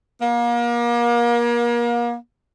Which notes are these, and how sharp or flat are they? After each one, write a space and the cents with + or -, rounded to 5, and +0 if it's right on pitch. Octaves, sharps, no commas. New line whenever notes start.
A#3 +35